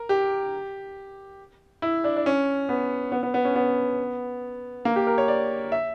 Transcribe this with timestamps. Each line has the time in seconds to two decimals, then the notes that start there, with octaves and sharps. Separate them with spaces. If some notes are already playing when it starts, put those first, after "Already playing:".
Already playing: A#4
0.09 G4
1.82 E4
2.04 D4
2.17 D4
2.26 C#4
2.69 B3
3.12 B3
3.23 B3
3.34 B3
3.45 C#4
3.56 B3
4.85 A#3
4.96 G4
5.07 A#4
5.18 C#5
5.28 D5
5.72 E5